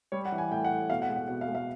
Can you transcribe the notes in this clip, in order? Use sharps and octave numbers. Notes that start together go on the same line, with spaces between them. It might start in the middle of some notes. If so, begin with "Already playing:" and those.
G3 C#5
F#5
E3
G#5
A2 G5
F#5
A2
B2 F5
F#5
G#3
F#5
B2 F#5
F5
G#3
F5